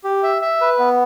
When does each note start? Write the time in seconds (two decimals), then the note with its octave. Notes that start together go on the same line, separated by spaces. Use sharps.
0.04 G4
0.23 E5
0.42 E5
0.61 B4
0.79 B3